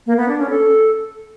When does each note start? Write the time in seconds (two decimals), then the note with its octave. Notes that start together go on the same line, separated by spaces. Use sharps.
0.06 A#3
0.17 B3
0.28 D4
0.39 C#4
0.50 A4